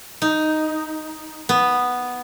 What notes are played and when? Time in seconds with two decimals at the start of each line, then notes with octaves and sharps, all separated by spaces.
0.22 D#4
1.49 B3